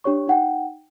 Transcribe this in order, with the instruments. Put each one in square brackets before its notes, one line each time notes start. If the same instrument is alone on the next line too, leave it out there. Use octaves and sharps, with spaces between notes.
[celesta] D4 G4 C#5 C#6
D#4 F#5 G5